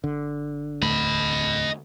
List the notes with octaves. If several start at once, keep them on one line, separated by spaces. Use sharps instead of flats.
G1 D3
D1 E2 D3 A3 D#5 B5